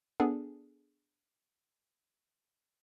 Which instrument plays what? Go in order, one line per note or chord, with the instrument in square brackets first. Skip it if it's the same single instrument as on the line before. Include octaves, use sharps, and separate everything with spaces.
[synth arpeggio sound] B3 D4 G#4 A4